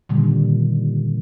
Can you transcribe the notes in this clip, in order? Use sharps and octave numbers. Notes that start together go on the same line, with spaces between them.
A#2 D3 D#3 G3